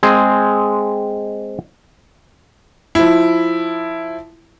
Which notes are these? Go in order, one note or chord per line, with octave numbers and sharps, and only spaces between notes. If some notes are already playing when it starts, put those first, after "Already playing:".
G#3 C4 G#4
F3 E4